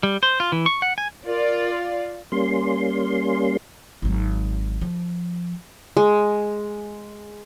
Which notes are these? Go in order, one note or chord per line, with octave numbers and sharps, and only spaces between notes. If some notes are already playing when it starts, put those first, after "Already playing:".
G3
C5
F4
E3
C#6
F#5
G#5
F4 A#4 D5
F5
G3 A#3 C#4 C6
G#1 F#3
F3
G#3